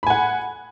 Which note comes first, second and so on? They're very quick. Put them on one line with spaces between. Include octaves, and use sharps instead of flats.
B5 G#5 F#5